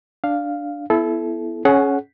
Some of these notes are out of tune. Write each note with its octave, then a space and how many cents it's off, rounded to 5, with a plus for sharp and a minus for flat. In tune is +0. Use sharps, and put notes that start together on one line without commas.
D4 +0 F5 +0
B3 +0 E4 +15 A4 -25
C#4 +0 G#4 +35 F#5 +0